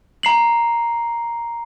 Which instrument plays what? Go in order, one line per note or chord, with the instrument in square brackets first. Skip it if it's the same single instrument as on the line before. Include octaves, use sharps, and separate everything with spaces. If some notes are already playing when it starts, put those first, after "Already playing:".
[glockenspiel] A#5 C7 F#7